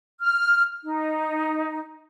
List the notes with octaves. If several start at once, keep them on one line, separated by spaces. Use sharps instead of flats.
F6
D#4